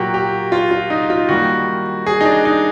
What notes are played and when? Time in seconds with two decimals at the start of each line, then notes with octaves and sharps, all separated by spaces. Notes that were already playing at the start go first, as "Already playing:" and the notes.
Already playing: A#2 F#3 A#3 F#4 G4
0.14 G4
0.52 F4
0.71 F4
0.90 D#4
1.10 F4
1.29 D#3 G3 A#3 F#4
2.06 G#4
2.21 D#4
2.25 D4
2.45 D#4